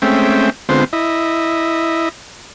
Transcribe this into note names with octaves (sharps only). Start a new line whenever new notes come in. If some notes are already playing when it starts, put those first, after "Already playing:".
G#3 A3 C4 C#4 E5 G5
D3 G#3 B3 C4 F4 C5
E4 D#5